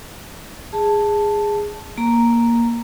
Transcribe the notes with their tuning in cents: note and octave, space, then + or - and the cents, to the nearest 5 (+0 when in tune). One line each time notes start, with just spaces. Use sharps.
G#4 -10 A5 +0
A#3 +10 A#5 +0